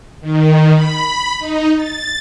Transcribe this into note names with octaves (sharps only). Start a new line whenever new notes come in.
D#3
B5
D#4
A6